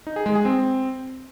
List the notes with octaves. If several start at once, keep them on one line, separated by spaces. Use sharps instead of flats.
D#4
G#4
G#3
G#4
C4